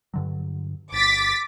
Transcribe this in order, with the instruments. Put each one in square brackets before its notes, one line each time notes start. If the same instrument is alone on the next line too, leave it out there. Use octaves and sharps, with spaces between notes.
[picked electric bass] G2 D3 F#3
[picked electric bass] G1 [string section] D6 A6 B6